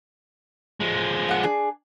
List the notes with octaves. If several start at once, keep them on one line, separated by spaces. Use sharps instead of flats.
F3 G#3
F5 F#5
D4 G#4